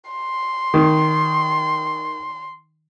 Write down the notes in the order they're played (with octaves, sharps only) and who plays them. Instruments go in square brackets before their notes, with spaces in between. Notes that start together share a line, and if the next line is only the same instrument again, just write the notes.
[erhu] C6
[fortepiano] D#3